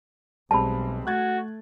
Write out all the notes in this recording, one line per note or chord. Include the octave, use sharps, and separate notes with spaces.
B1 G3 G#3 C4 A5 B5
A3 F#4 F#6 G#6 A6